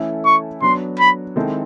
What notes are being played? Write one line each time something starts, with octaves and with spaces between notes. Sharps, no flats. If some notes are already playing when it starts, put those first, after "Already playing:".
Already playing: E3 A3 C#4 E4 A4
C#6
F#3 B3 D4 C6
B5
D#3 G#3 C4 E4 A4